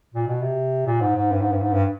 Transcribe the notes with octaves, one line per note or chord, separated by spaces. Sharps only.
A#2
B2
C3
A#2
G#2
G#2
G2
G#2
G2
G#2
G2